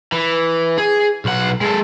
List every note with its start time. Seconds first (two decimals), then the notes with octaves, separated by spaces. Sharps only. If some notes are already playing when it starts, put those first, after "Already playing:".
0.12 E3
0.78 G#4
1.25 B1 F#5
1.61 G#3 A4